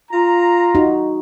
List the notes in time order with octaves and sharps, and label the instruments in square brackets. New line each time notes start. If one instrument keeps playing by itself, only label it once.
[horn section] F4 A#5
[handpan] D#4 F#4